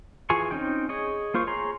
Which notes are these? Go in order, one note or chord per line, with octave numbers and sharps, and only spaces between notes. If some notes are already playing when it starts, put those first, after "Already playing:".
E3 F4 G#4 G#5 C#6
C4 C#4 D#4 G5
G#4 C#5 D#5
A#3 F4 C5 C#6
G#4 C#5 A#5 C6